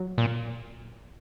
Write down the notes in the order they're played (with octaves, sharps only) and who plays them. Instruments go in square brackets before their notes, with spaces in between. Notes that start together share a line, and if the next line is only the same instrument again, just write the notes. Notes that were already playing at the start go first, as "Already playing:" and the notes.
Already playing: [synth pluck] F#3
[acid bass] A#2